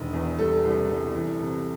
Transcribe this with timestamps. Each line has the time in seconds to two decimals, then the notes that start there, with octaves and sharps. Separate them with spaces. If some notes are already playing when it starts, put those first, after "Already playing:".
Already playing: E1 D#3
0.13 E2
0.38 G3 A4
0.64 C2
0.89 C2
1.14 E3
1.39 C3